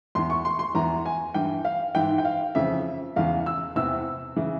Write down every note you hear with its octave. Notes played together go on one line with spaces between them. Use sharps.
E2 E3 C6
C#6
C6
C6
E2 E3 A#5
G#5
G2 E3 G5
F5
G#2 E3 G5
G5
F5
F2 C#3 E3 E5
E2 C#3 E3 F5
E6
E2 C3 E3 E6
C#3 E3